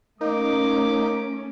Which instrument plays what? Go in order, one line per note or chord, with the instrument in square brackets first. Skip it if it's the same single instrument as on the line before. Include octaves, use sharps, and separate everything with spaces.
[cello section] A3 C#4 [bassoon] A#3 [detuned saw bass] D#4 [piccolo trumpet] D6